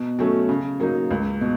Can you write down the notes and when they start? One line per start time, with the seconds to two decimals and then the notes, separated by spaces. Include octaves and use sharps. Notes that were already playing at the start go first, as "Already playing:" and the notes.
Already playing: B2
0.19 F#3 A3 C#4
0.49 C#3
0.80 F#3 A#3 D#4
1.11 C#2
1.41 B2